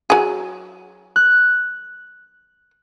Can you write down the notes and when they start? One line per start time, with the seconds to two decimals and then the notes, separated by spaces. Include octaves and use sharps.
0.10 F#3 G#4
1.16 F#6